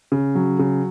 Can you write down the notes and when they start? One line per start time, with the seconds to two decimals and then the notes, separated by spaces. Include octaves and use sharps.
0.12 C#3
0.35 F#3
0.59 C#3